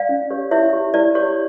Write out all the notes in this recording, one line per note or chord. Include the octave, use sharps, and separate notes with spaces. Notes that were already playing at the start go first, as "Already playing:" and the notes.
Already playing: D5 F5
C#4
G4 C#5
E4 C#5 E5
G4 C#5
E4 D5
G4 C#5